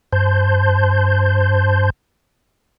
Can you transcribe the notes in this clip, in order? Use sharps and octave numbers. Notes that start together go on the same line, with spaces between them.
G2 C5 A5 C6 G6